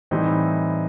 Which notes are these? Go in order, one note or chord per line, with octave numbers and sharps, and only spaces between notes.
A2 E3 G3 C4 D#4